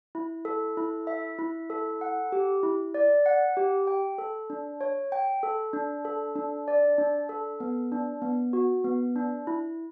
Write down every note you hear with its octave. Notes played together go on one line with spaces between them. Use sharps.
E4
A4
E4
E5
E4
A4
F#5
G4
E4
D5
F#5
G4
G5
A4
D4
C#5
G5
A4
D4
A4
D4
D5
D4
A4
B3
D4
B3
F#4
B3
D4
E4